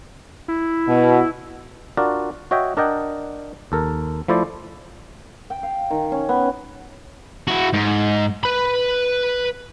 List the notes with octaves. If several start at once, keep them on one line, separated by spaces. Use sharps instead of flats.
E4
B2
D4 F4 F#4 A#4 D5
F#4 C#5 D#5 E5 G5
D4 A#4 D5 D#5 F#5 G5
D#2 A4 A#4
F3 A3 E4 C5 D5
G5
F5
D#3
C#4
B3
E4 F#4
G#2
B4 B5